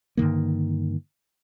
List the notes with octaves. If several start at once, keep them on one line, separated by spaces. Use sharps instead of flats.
G2 D3 D#3 A#3